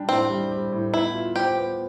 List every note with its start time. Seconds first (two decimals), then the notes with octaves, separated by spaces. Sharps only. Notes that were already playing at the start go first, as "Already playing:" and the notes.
Already playing: G3 D4 G4
0.09 A2 C4
0.30 G3
0.51 G3
0.72 A2
0.93 B3 E4
1.14 F4
1.36 G4 C5
1.57 B3